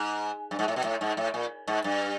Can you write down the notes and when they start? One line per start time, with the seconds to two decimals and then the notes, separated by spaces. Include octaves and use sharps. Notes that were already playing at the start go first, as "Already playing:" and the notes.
Already playing: G#2
0.51 G2
0.59 G#2
0.68 A2
0.76 B2
0.84 A2
1.01 G#2
1.17 A2
1.34 A#2
1.67 G#2
1.84 G2